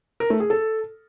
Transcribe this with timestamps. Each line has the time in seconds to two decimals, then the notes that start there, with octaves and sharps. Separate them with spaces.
0.20 A#4
0.30 A3
0.40 G#4
0.50 A4